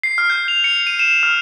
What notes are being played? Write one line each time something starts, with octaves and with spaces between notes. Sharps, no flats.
C7
F6
G6
F7
C#7
D#7
E7
F6